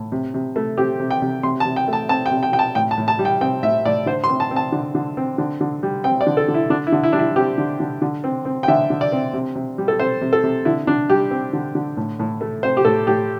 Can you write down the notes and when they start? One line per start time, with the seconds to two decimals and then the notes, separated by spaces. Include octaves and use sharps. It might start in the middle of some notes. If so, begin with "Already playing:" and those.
Already playing: A2
0.12 C3
0.34 C3
0.56 A3
0.78 C4 G4
1.00 C3
1.11 G5
1.22 C3
1.43 C3 C6
1.60 A5
1.65 C3
1.76 G5
1.88 A3
1.93 A5
2.09 C4 A5
2.26 G5
2.31 C3
2.43 G5
2.53 C3 G5
2.59 A5
2.75 A2 G5
2.91 A5
2.98 A2
3.08 A5
3.19 G3
3.25 G5
3.41 C4 G5
3.63 A2 E5
3.85 A2 D5
4.06 D3 C5
4.24 C6
4.29 C4
4.40 A5
4.51 C4
4.56 A5
4.72 D3
4.95 D3
5.17 C4
5.38 D3
5.61 D3
5.83 G3
6.04 C4 G5
6.21 D5
6.27 D3
6.37 A4
6.48 D3
6.54 E4
6.70 D3 D4
6.87 E4
6.92 D3
7.03 E4
7.13 G3 D4
7.19 E4
7.36 C4 G4
7.58 D3
7.80 D3
8.02 D3
8.24 C4
8.45 C4
8.63 G5
8.68 D3 E5
8.90 D3
9.01 D5
9.12 C4
9.33 C3
9.55 C3
9.78 G3
9.88 A4
9.99 C4 C5
10.21 C3
10.33 A4
10.43 C3
10.65 D3 E4
10.87 D3 D4
11.10 G3 G4
11.31 C4
11.53 D3
11.75 D3
11.97 A2
12.19 A2
12.41 A3
12.63 C4 C5
12.77 G4
12.85 A2 A4
13.07 A2 G4